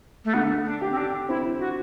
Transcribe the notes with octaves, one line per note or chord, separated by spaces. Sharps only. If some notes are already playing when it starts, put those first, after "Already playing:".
A3
D3 B3
D4
G4
C4
D4
C4 E4
F#4